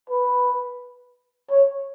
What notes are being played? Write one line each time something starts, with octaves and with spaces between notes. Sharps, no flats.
B4
C#5